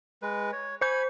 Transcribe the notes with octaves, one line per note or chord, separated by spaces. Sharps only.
G#3 B4
C#5
C5 G#5 B5 G6